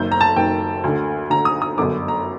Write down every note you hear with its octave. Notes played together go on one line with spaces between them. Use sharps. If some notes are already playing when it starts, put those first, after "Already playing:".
Already playing: F#1 F#2 D#3 G6
A#5
A5
F#1 F#2 D#3 G5
D2 D3
D2 D3 A#5
D#6
D#6
G1 F#2 D3 D6
A#5